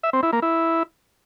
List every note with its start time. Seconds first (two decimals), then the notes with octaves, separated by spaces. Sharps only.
0.03 E5
0.13 C4
0.23 E4
0.33 A#3
0.42 E4